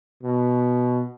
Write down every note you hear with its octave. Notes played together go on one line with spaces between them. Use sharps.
B2